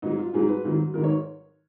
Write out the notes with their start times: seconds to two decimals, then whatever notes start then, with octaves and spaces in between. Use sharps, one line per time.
0.02 G#2 F#3 D#4
0.19 F4
0.34 G#2 F#3 G#4
0.49 B4
0.64 G#2 D#3 F#3
0.94 G#2 D#3 F#3 A#4
1.04 C#5